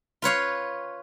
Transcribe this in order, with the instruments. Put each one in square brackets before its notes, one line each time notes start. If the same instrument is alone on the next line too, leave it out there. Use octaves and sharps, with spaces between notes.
[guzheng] F4 B4 C#5 F5